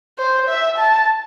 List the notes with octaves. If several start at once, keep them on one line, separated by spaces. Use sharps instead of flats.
C5
E5
A5